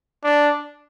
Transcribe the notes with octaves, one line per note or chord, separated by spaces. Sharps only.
D4